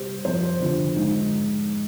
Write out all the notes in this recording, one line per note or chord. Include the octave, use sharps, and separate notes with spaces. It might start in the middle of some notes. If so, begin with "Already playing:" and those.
Already playing: C3 G3 C5
F2 C5
D3 F3
G#2 D#4